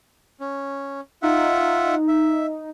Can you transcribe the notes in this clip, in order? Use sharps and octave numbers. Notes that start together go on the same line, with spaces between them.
C#4
D#4 F4 E5 F#5
E5